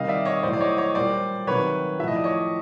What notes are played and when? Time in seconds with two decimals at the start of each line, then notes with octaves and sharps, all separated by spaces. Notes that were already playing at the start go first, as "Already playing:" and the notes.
Already playing: C3 D#3 G3 D#5 F5
0.08 D5 E5
0.25 C#5 D#5
0.43 A2 F#3 C5 D5
0.53 D5
0.60 C#5 D#5
0.78 C#5 D#5
0.95 A#2 G3 C5 D5
1.47 C3 D#3 F#3 B4 C#5
1.99 A2 F3 E5
2.08 D#5
2.16 D5
2.24 C#5 D#5